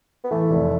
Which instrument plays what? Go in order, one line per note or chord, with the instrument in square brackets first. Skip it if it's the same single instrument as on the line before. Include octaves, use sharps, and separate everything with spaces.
[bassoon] B3
[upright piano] E3 [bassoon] A3
[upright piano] F1